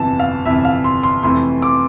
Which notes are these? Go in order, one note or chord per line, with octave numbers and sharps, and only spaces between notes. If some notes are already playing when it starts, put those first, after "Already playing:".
Already playing: G1 F2 C3 E3 A5
F5
G1 F2 C3 E3 E5
F5
C6
C6
F2 C3 E3 A3 C6
D6